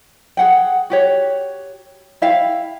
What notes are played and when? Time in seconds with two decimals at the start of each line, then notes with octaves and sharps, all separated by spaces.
0.37 G#4 F#5 G5
0.90 F#4 G4 C#5
2.22 E4 E5 F5 G5